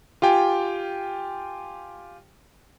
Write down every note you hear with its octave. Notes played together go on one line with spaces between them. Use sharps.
F4 G4 G5 G#5